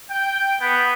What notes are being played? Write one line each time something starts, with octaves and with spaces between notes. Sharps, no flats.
G5
B3